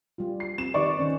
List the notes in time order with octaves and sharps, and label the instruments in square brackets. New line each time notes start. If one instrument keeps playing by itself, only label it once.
[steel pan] G3 F4
[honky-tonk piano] C7
[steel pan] C4 [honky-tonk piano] E7
[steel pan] D#3 B4 [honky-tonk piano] D#4 D5 C#6
[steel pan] D#3 C#4 C5